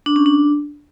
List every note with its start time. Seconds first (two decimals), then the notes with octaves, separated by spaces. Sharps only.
0.06 D4
0.16 C#4
0.26 D4